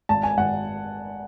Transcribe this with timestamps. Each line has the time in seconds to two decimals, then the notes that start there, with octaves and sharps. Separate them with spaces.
0.09 G#1 A5
0.23 G#5
0.37 G#1 F#5